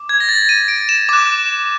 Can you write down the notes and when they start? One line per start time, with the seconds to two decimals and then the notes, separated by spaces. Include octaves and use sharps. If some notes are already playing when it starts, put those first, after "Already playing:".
Already playing: D6
0.09 G#6
0.20 A#6
0.29 A6
0.49 D#7
0.68 D7
0.89 E7
1.09 D6 F#6